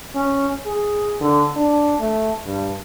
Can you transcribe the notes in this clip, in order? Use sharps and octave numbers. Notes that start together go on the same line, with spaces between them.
C#4
G#4
D3
D4
A3
G2